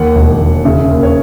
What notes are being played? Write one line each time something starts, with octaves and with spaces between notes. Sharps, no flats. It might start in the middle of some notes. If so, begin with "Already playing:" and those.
Already playing: D#2 F#5
E1
E1
C#3 E5
D#2
C#5